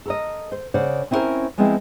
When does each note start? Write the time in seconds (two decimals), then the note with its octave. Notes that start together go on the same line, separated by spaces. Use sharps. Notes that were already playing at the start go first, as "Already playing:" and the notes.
0.06 A4 A#4 D#5
0.52 C5
0.74 C#3 C5 D5 F#5
1.11 C4 C#4 E4 F#4 A#4 C5
1.58 F3 G#3 B3 C4 E4